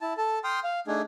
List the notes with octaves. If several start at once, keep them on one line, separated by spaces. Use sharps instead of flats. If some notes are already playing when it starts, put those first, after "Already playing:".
E4 A5
A4 A5
G5 C6 D#6 F6
F5
A3 D4 D#4 G#4